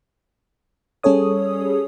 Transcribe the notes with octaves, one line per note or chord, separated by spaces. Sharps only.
G3 C#4 G#4 A4 C#5 D#6